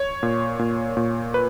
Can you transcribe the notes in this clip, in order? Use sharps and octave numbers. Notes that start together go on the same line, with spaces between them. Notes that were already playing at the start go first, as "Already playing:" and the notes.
Already playing: C#5
A#2
A#2
A#2
B4